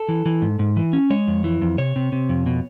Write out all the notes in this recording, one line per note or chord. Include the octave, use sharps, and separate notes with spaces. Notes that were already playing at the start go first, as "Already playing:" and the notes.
Already playing: A4
E3
E3
G#2
G#2
E3
C#4
G#3 C#5
F2
E3
F2
C3 C#5
C3
C3
F2
B2